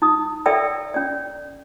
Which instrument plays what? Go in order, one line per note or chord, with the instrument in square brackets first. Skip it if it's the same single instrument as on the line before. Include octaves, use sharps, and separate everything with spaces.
[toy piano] D#4 D#6
A4 D5 E5 G5 E6
C#4 D5